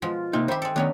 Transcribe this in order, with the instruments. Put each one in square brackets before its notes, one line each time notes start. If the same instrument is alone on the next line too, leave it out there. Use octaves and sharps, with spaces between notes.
[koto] B2 F3 G#3 [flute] F4
[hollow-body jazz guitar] C3 A#3 D#4 [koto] C4
[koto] D#3 G4 [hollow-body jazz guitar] C5 E5 [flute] B5
[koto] G#3 A4 [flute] G5
[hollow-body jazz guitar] D#3 A3 B3 [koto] F#3 C#4 D4